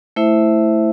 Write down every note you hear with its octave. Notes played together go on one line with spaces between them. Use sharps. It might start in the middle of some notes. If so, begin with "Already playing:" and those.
A3 E4 C5 E5